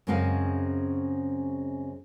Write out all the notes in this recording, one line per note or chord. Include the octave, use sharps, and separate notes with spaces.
F#2 C#3 G#3 C4 F5 G#5